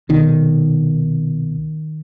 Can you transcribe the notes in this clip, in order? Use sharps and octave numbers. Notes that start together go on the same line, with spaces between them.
C2 B2 D#3